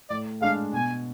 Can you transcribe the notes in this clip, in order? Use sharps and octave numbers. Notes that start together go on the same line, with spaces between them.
A2 D5
G#3 D4 F5
B2 G#5